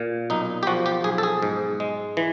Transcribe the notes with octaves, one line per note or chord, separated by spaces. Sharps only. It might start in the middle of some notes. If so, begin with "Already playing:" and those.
Already playing: A#2
B1 D#4
G4
F3 F#4
G4
B1 G#4
A4
G#4
G#2
G#3
E3